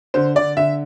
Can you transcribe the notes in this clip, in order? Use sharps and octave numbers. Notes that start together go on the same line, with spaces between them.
D3 C5
D3 D5
D3 E5